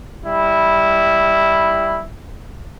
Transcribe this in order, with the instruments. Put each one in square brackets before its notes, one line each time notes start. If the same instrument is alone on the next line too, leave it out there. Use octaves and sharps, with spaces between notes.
[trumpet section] G3 E4